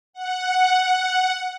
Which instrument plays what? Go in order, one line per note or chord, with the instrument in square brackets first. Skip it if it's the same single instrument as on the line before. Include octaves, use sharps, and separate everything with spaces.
[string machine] F#5